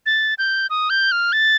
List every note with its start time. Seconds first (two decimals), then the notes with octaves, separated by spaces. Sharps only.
0.06 A6
0.38 G6
0.70 D#6
0.90 G6
1.12 F6
1.33 A6